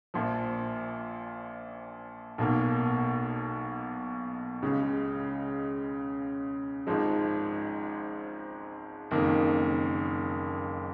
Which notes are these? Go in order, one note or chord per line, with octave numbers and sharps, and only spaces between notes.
A#1 A#2 F3
B1 B2 A#3
C#2 C#3 G#3
G#1 G#2 F3 G#3
F#1 F2 D#3 A#3